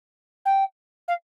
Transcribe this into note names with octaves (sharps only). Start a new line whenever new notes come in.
G5
F5